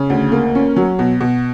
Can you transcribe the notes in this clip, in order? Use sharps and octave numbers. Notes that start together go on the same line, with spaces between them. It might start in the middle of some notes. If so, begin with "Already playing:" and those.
Already playing: C#3
D2
A#3
C#4
F#3
B2
B2